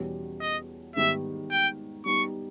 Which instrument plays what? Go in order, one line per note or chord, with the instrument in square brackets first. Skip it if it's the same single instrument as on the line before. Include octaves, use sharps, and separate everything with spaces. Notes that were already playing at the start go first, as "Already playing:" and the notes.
Already playing: [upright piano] E2 B2 G3 C#4
[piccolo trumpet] D#5
[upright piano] G#2 D#3 G3 B3 G4 [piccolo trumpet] E5
[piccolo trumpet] G5
[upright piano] G3 B3 D#4 [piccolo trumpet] C#6